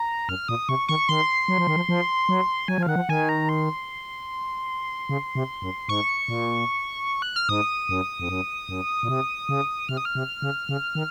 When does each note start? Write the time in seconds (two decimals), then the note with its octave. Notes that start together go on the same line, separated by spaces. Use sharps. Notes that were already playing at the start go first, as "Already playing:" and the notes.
Already playing: A#5
0.29 F#2 F6
0.48 A#2 D#6
0.69 C3 C#6
0.88 D#3 C#6
1.09 D#3 C6
1.48 F#3
1.58 F3
1.67 D#3
1.76 F3
1.89 F3
2.29 F#3
2.68 F#3 G#5
2.78 F3
2.83 F5
2.86 D#3 F#5
2.96 F3
3.09 D#3 G#5
3.29 A#5
3.49 C6
5.09 C#3
5.35 C3
5.62 F#2
5.89 G#2 C#6
6.28 A#2
7.22 F#6
7.36 F6
7.49 G#2 D#6
7.89 F#2
8.20 F2
8.29 F#2
8.69 F#2
9.03 A#2
9.08 C3
9.49 C#3
9.89 C3 F6
9.97 D#6
10.05 F6
10.15 C3
10.42 C#3
10.69 C#3
10.95 D#3